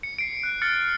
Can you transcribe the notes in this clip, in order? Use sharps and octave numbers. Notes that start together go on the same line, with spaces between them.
C#7
C7 D7
F#6
F6 A6 C#7